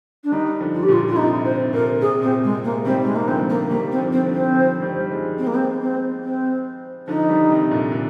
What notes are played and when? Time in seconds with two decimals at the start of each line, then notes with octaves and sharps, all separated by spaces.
0.24 D4
0.32 D#3 G3 D#4
0.61 D3 F3
0.74 F4
0.83 G4
0.88 A#2 D3 F4
1.08 F4
1.12 D3
1.17 C3 D#4
1.45 C3 C5
1.73 A#2 D3 A#4
2.01 C3 G#4
2.22 A#2 C4
2.44 C3 G#3
2.64 C3 A#3
2.85 D#3 G3 C4
3.03 G#3
3.16 A#3
3.28 D3 F3 C4
3.50 A#3
3.70 D#3 G3 A#3
3.91 C4
3.98 D3 F3
4.12 C4
4.26 D3 F3
4.34 C4
4.54 D3 F3
4.82 D#3 G3
5.00 G3
5.11 F3 G#3
5.38 C4
5.47 A#3
5.55 C4
5.81 C4
6.24 C4
7.08 D3 F3 D#4
7.29 D#3 G3
7.50 C3 D#3
7.71 A#2 D3
7.92 A#2 D3